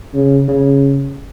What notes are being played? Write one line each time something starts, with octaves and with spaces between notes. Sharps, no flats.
C#3
C#3